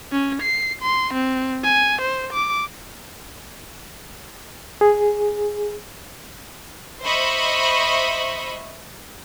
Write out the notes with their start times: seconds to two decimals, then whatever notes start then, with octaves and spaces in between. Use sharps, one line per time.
0.12 C#4
0.42 C7
0.82 C6
1.14 C4
1.64 G#5
2.01 C5
2.33 D6
4.81 G#4
7.04 C5 D#5 E5 B5 C#6